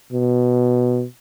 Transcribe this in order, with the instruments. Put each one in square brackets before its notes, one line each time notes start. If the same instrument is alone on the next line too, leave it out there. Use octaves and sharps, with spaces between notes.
[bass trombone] B2